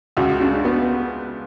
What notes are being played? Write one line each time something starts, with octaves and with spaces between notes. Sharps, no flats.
C#2 F#4
C#3 D4
B3